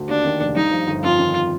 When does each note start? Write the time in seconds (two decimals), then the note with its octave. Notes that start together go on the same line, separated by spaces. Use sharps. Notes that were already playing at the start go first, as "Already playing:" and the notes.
Already playing: D2
0.09 D#2 D4
0.25 D#3
0.40 F1
0.55 G2 D#4
0.71 F3
0.87 G1
1.03 F2 F4
1.19 D#3